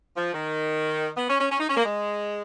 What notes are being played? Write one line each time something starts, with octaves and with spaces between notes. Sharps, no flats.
F3
D#3
B3
C#4
C#4
C#4
D#4
C#4
A#3
G#3